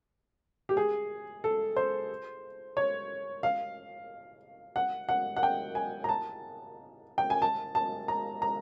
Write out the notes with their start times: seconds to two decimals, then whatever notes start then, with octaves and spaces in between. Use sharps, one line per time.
0.69 G4
0.77 G#4
1.44 A4
1.76 C5
2.77 C#5
3.43 F5
4.76 F#5
5.09 F#5
5.37 F#5
5.43 G5
5.75 G#5
6.04 A#5
6.09 A5
7.18 G5
7.30 G#5
7.42 A5
7.75 A5
8.08 A#5
8.42 A#5